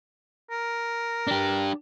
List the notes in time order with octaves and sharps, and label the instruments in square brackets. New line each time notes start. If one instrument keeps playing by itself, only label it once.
[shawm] A#4
[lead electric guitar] D4 G4